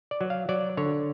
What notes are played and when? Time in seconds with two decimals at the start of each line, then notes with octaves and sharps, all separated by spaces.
0.11 D5
0.21 F#3
0.30 F5
0.49 F#3 D5
0.77 D3 C#5